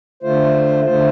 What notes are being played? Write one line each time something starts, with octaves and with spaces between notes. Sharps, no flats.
D3 A3 F4 C5
D3 A3 F4 C5